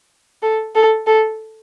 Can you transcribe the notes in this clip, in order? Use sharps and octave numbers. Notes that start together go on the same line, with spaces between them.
A4
A4
A4